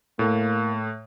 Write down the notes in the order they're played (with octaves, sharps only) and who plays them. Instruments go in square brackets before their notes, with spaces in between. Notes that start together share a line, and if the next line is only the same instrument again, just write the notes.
[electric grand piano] A2 [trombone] A#3